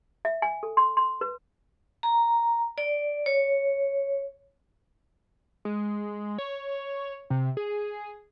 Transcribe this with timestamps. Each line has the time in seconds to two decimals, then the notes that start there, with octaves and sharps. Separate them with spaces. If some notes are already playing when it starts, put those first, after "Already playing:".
0.25 E5
0.42 G#5
0.63 A4
0.77 C6
0.97 C6
1.21 B4
2.03 A#5
2.78 D5
3.26 C#5
5.65 G#3
6.38 C#5
7.30 C3
7.57 G#4